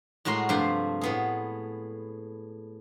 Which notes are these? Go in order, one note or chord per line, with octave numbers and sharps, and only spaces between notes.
A2 G#3 F#4 A#4 C6
G2 C3 F3 A3 C5 C6
A2 B3 G#4